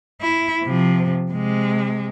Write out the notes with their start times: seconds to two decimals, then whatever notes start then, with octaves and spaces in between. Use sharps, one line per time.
0.21 E4
0.64 C3 F3
1.31 C3 G#3